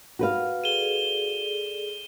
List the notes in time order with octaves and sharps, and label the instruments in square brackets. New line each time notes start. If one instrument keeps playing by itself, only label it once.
[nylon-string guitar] F#4 B4 F5
[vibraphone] G#4 A4 D5 [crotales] D#7 E7 G7